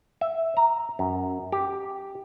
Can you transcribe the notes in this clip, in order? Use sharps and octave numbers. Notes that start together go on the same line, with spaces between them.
E5
A#5
F#2
G4